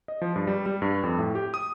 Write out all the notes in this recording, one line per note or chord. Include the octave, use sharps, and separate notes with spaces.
D#5
F3
G2
G3
G3
G2
F2
A2
G4
D#6